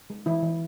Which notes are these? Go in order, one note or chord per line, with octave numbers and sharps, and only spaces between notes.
G#3
E3 E4
E3